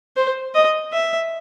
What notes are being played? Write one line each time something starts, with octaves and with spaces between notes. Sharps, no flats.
C5
D#5
E5